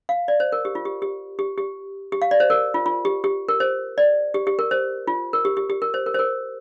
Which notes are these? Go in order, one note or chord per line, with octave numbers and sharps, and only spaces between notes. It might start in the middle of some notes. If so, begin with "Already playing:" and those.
F5
D5
C5
A#4
G4
F4
G4
G4
G4
G4
G4
F5
D5
C5
A#4
F4
F4
G4
G4
A#4
C5
D5
G4
G4
A#4
C5
F4
A#4
G4
G4
G4
A#4
C5
A#4
C5
A#4